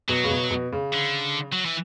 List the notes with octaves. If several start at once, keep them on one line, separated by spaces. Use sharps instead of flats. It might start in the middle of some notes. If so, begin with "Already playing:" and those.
B2 F#3
C#3
B2
B2
C#3
D3
F#3
E3